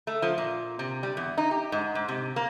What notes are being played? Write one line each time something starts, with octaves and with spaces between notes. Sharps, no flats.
A3
F3
A#2
C3
G3
E2
D#4
G4
G#2
G#2
C3
A#3